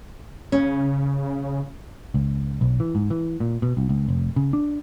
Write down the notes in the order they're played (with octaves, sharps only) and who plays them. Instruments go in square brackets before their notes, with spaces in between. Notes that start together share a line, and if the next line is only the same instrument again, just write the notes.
[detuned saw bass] C#3 [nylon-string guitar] C#4
[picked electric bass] C#2
B1
E3
G#2
E3
A#2
B2
C2
C#2
F1
C#3
D4